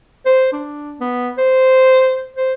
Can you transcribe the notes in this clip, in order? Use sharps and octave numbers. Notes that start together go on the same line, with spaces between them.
C5
D4
B3
C5
C5